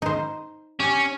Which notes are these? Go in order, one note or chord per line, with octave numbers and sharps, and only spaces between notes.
D#4 C5
C#4 G4